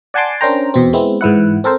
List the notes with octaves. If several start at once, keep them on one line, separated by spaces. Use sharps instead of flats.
D5 F#5 G#5 A5 C6 D6
C#4 D4 A#4 C5 G5 A#5
E2 B2 C4
G#3 B3 C4 E4
G#2 E3 E4 F#5
C4 A4 A#4 C5